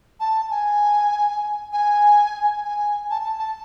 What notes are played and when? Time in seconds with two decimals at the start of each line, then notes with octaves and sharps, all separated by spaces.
0.20 A5
0.50 G#5
1.73 G#5
2.64 G#5
3.10 A5
3.24 A5
3.38 A5